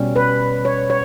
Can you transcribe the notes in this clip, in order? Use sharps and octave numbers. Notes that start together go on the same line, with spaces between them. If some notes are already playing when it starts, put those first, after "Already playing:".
Already playing: B2 G3 C#4
B4
C#5
C#5